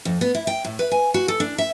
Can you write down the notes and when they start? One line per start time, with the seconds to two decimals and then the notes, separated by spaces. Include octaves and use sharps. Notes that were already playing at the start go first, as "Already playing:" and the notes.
0.05 F2
0.21 B3
0.35 E4
0.47 G5
0.65 A2
0.79 B4
0.92 G#5
1.14 F#4
1.28 A4
1.40 D4
1.58 E5